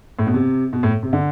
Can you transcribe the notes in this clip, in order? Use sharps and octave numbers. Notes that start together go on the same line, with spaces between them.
A2
B2
C3
B2
A2
C3
D3